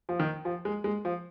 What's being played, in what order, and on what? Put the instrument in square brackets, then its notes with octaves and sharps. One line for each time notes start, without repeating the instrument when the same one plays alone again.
[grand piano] F3
D#3
F3
G#3
G#3
F3